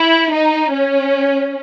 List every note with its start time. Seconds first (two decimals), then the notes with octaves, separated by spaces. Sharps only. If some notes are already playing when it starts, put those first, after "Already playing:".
Already playing: E4
0.31 D#4
0.72 C#4